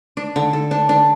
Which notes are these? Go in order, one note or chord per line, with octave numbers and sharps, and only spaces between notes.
D4
D3
A4
D4
D4